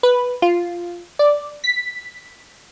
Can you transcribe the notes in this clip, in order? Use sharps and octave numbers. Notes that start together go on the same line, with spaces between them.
B4
F4
D5
B6